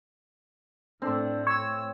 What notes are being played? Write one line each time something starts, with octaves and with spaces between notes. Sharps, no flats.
A2 A3 C4 D4
C#5 E6